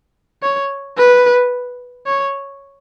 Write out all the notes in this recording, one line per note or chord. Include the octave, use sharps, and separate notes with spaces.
C#5
B4
C#5